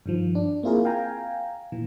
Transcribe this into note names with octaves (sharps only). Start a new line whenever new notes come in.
G2 D#3 F3
D4
A#3 C4 E4 F4 G#4 A#4
F5 G5 G#5 A#5
A#2 E3